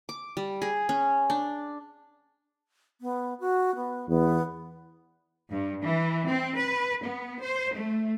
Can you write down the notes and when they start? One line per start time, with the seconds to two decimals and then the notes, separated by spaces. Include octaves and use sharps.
0.09 D6
0.37 G3
0.62 G#4
0.89 C#4
1.30 D4
3.01 B3
3.40 F#4
3.76 B3
4.09 E2 B3
5.50 G2
5.82 E3
6.25 C4
6.57 B4
7.03 B3
7.40 C5
7.74 A3